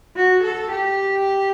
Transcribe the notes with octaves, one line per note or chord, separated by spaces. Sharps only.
F#4
A4
G4